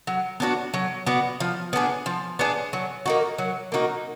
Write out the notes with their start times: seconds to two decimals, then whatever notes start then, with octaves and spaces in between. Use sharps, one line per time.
0.07 F#3
0.40 B3 D4 F#4
0.74 F#3
1.07 B3 D4 F#4
1.40 F3
1.73 B3 D4 G#4
2.06 F3
2.39 B3 D4 G#4
2.73 F#3
3.06 A#3 D#4 F#4
3.38 F#3
3.72 A#3 D#4 F#4